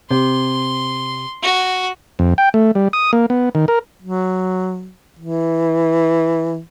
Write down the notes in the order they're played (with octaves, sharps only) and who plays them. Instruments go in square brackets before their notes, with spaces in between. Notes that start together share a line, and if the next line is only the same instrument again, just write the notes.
[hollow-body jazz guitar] C3 [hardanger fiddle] C6
[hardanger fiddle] F#4
[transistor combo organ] F2
G5
A3
G3
D#6
A#3
B3
D#3
A#4
[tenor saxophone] F#3
E3